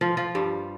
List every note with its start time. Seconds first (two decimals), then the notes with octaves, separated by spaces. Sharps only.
0.01 F3 F4
0.17 F3 F4
0.35 G2 G3